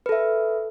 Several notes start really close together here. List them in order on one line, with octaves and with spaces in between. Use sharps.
B4 A4 E5